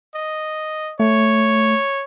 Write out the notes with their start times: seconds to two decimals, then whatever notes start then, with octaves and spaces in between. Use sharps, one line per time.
0.15 D#5
1.00 A3 C#5